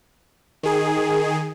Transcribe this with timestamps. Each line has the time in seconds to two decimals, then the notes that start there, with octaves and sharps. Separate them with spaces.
0.63 D#3 G#4